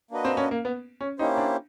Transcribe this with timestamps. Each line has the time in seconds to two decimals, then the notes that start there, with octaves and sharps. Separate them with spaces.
0.11 A#3 D4 F#4 B4 D#5
0.25 C4
0.37 C#4
0.51 A#3
0.65 B3
1.01 C#4
1.19 A#3 C#4 D#4 E4 G4 C5
1.37 D4